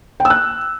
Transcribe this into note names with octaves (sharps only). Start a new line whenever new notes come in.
G5
E6
F#6